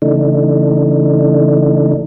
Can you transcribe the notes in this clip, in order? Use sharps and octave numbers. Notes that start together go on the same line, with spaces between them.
C#3 E3 A3 D4 D#4